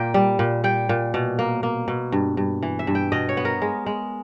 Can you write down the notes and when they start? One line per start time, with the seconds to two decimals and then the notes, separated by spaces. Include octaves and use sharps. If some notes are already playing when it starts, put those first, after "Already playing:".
Already playing: A#2 A#3 G5
0.14 G3
0.39 A#2
0.64 G3 G5
0.89 A#2
1.14 B2
1.39 A#3
1.63 A#3
1.88 B2
2.12 G2
2.37 G2
2.63 E3
2.79 E5
2.87 G2
2.95 G5
3.12 B2 D#5
3.29 C#5
3.37 B3
3.45 A#4
3.62 G#3
3.86 G#3